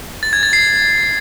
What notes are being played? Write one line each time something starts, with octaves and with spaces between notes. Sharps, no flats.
A6
G#6
A6
C7